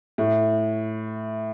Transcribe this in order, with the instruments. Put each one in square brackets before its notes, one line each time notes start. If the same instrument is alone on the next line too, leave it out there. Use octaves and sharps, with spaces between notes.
[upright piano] A2